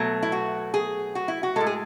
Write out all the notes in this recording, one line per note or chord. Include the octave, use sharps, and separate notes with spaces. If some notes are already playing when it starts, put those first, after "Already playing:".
Already playing: B2 F#3 A3
E4
F#4
G#4
F#4
E4
F#4
A2 G#3 A4
G#4